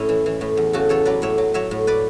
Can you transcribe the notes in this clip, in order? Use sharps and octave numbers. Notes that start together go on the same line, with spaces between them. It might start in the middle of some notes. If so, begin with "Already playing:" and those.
Already playing: A2 C#4 E4
E3
E3
A2
E2
C#3 F#4 A4
E2 A4 C#5
F#3 B4 D5
A2 C#5 E5
F#3
F#3 C#5 E5
A2
B4 D5